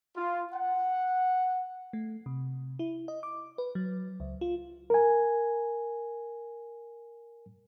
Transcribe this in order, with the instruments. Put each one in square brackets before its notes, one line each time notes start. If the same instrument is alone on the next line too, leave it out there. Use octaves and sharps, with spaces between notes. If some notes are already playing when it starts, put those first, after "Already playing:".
[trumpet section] F4
F#5
[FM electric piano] A3
C3
E4
D#5
D6
B4
F#3
C#2
F4
[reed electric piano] A#4 G#5